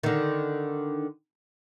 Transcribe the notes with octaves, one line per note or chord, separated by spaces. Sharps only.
D3 D#3